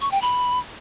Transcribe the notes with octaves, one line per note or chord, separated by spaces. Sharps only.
C#6
G5
B5